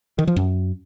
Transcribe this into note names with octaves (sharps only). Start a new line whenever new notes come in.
D#3
F3
F#2